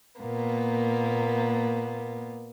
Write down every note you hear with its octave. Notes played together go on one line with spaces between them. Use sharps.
A#2 A#3 B3